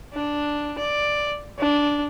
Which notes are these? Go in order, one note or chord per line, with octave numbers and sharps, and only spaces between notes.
D4
D5
D4